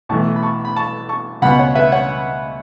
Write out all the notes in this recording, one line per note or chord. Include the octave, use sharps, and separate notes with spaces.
B1 A2 E3 A5 C#6
B5
A5 C#6
B5
A5 C#6
A5 C#6
C#2 B2 B3 F#5 B5
C#5 F#5
B4 E5
C#5 F#5